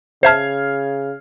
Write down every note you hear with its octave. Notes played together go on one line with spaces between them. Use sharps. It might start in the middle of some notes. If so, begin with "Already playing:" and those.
C#3 C5 E5 A5 F6 G#6 C7